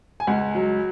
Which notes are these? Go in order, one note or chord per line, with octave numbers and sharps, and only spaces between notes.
G#5
C#2 F#5
F#3